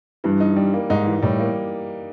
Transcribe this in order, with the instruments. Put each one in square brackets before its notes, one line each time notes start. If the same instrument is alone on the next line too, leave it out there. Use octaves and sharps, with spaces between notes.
[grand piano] G2 [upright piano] E3
[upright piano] D#4
G3
A#3
[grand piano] G#2 [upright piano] D#4
[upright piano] E3
[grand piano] A2 [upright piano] G3
[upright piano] A#3